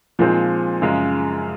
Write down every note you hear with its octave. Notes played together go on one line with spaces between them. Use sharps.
A#2 F3 G#3 C4 D#4
F#2 C#3 G#3